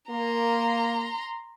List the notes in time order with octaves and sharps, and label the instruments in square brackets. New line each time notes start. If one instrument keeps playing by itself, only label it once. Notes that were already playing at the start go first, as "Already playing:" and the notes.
[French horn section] A#3 [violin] A#5 C6